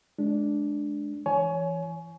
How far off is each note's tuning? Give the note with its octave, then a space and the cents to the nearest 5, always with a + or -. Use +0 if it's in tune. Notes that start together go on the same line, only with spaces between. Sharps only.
G#3 +25 D4 +0
E3 +15 C#5 +15 G#5 +25